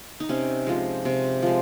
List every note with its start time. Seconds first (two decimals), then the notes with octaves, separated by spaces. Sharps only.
0.20 D#4
0.29 C3 C#4
0.67 F3 G#3
1.05 C3
1.42 F3 G#3